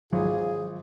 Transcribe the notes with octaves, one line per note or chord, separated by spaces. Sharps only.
G#1 F#3 F4 G#4